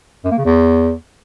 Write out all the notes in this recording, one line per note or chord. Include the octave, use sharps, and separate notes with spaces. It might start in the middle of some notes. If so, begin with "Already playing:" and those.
F#2
A#3
C#3
E2